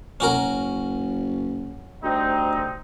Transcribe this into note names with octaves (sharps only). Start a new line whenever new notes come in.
F#1 C#4 F#4 A#4
D2 G3 C4 D#4